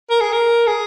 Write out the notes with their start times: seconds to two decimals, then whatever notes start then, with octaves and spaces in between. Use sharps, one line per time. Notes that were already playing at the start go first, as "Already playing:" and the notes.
0.10 A#4
0.20 G#4
0.32 A#4
0.67 G#4